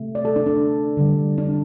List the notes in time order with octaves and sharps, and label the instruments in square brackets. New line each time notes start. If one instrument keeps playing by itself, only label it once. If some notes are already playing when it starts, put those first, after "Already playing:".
Already playing: [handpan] C3 A3
D5
A4
D4
D4
D3 G3
D4